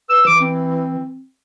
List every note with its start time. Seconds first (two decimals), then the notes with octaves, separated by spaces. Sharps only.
0.10 B4 E6
0.27 E3 D6
0.40 C4